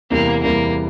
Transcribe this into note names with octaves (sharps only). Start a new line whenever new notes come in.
E2 C3 E3 G3 A#3
E2 C3 E3 G3 A#3